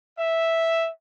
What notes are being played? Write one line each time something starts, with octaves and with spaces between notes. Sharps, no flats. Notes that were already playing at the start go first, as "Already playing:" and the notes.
E5